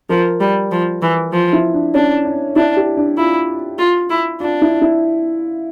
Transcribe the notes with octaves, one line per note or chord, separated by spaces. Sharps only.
F3 A#4
G3
F3
E3
F3
E4
D4
C#4 D4
D4
D4 E4
G4
D4
E4 F4
F4
E4
D4 F4
E4
E4